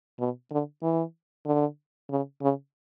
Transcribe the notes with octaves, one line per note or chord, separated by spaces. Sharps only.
B2
D3
E3
D3
C#3
C#3